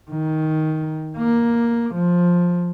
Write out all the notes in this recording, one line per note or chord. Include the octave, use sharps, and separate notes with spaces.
D#3
A#3
F3